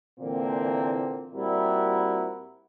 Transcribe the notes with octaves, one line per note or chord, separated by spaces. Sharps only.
A#2 D3 E3 A#3 C4
A#2 G3 C4 E4 F#4 A#4